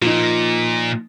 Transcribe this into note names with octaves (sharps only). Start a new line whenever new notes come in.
A#2 F3 D#4